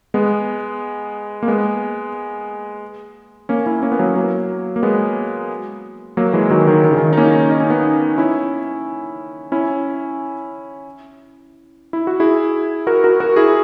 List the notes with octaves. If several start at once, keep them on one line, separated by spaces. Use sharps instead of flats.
G#3 B3
A#3
G#3 B3
A#3 C#4
C#4 E4
A#3 C#4
B3
F#3 A#3
F#3 A#3
A#3
G#3 B3
F#3 A#3
E3 G#3
D#3 F#3
D#3
D#3
C#3
D#3
D#4
A#3 C#4
D#4
C#4
B3 D#4
C#4 E4
C#4 E4
E4
F#4
E4 G#4
F#4 A#4
F#4 A#4
F#4 A#4
E4 G#4